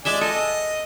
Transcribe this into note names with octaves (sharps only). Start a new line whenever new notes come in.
G#3 D5 E5 G#5 A5
A4 D#5